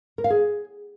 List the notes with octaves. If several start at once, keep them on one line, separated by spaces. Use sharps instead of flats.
A#4
F5
G#4